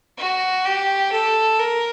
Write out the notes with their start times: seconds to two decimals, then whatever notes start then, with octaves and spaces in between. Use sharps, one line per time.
0.18 F#4
0.65 G4
1.12 A4
1.59 A#4